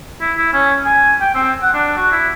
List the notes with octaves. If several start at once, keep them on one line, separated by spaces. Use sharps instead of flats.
E4
E4
C#4
G#5
G5
C4
F#5
D4
F#4
E4